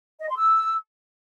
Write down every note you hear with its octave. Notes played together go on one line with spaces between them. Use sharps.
D#5
C6
E6